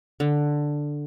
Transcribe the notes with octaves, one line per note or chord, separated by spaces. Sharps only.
D3